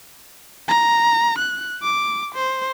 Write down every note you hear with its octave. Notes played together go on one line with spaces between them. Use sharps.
A#5
F#6
D6
C5